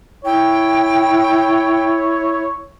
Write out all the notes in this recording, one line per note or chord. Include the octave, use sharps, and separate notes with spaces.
E4 C#5 G5